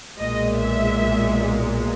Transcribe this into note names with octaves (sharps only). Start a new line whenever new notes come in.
B1 A#2 G#3 D#5
E5